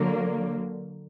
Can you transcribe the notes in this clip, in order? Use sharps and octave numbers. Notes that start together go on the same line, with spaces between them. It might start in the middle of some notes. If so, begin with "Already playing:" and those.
Already playing: D3 F#3 A#3